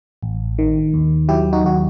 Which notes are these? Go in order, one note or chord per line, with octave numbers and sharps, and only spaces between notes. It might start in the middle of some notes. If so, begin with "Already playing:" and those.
A1
D#3
D#2
F#3 E4 G4
D#4 F#4
D#2 F#4